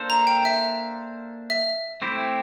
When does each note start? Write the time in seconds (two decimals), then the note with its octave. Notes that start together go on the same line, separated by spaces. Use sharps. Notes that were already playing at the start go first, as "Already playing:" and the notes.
Already playing: A#3 D4 A4 C5
0.10 A#5
0.27 G5
0.45 E5
1.50 E5
2.02 A3 C4 E4 G4 C5